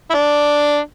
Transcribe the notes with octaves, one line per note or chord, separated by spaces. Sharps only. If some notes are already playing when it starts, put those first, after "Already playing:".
E4
D4